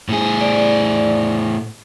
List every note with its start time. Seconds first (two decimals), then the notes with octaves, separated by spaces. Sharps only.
0.09 A2 G#4
0.41 D5